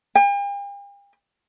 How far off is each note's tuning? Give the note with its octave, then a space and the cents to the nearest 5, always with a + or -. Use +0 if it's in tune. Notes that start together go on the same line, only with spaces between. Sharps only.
G5 +45